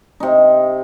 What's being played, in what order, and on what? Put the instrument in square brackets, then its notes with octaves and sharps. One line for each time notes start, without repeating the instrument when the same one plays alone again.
[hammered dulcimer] C3 D#4